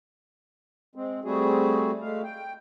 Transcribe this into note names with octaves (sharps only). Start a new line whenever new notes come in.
G#3 C4
G3 A3 C4 F#4 G#4
G#3 A3 F5
G5